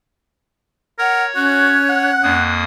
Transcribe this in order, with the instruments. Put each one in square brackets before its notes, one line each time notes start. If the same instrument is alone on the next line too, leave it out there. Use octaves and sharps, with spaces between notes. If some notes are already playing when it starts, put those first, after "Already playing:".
[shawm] A#4 [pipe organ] C#5 [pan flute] F#5
[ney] C#4 [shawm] F#4 [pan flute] F#6
[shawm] F#5
[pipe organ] F2 A#3 D#6